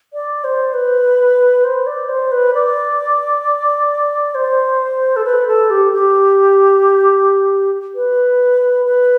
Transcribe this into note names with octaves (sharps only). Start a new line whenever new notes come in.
D5
C5
B4
C5
D5
C5
B4
D5
C5
A4
B4
A4
G4
G4
B4
B4